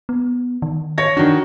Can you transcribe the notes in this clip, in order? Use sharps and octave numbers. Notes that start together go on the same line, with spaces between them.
B3
D#3
C#5 A#6
D#3 D4 F#4